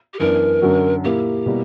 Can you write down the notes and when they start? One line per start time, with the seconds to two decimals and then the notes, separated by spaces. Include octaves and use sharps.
0.14 G4
0.19 F#2 E3 B3 D4 A#4
0.62 F#2 D3 F#3 C#4 F#4
1.04 A#2 A#3 E4 G4
1.46 B2 G3 A#3 E4 A#4